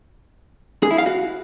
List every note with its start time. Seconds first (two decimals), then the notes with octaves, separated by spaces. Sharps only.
0.83 G#4
0.91 E4
0.98 F5
1.06 F#4